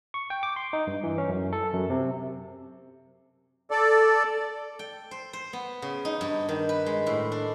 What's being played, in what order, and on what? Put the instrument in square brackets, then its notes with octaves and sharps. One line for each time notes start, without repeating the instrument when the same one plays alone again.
[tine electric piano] C#6
G5
D6
C6
D#4
G2
E3
C#4
F#2
A4
F#2
C3
[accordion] A4 D5
[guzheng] G5
C5
C5
B3
C#3
D#4
G2
D#3
B4
G#3
A2
D4